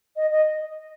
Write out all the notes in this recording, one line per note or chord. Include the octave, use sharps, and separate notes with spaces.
D#5
D#5